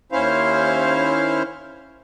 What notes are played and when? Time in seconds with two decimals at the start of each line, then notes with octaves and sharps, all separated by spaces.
0.12 D#2 C#4 E4 C5 F5